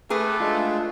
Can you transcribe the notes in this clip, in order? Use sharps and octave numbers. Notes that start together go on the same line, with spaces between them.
A3 G4 G#4 B4
G#3 D4 F4